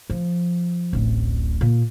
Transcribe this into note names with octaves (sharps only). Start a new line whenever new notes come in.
F3
D1 A1
A#2